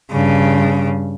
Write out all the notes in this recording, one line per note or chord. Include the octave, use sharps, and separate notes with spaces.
G2 C#3